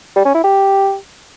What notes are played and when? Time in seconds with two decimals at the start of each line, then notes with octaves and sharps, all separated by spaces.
0.16 G3
0.25 C#4
0.34 E4
0.44 G4